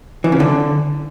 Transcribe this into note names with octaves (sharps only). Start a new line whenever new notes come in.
E3
C#3
D3